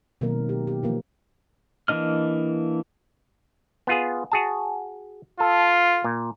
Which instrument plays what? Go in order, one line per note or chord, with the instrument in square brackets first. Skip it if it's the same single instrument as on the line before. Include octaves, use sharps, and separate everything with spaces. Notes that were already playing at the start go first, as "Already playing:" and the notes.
[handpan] B2 D#3 F#3 A#3 C4 A#4
G4
G4
E3 F3 A#3
[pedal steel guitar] E3 A#3 D4 D#5 F6
[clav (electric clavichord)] B3 F4 G#4
F#4 G#4 A5
[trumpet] F4 [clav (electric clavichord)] A4
[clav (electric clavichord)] A#2